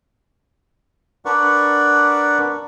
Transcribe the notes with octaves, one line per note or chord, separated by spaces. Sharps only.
D4 A#4 B4 D5 F#5 C#6